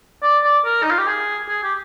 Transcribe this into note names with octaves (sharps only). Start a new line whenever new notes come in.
D5
D5
A#4
D#4
F4
G4
G#4
G#4
G4